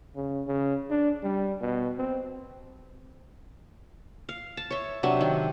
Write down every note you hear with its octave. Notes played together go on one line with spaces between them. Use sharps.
C#3
C#3
D4
G3
B2
C4
F5
A5
C#5 E5
C3 F#3 D4 E5
D#3